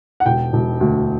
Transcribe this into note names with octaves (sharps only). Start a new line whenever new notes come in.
F#5
E1 G5
E1
D2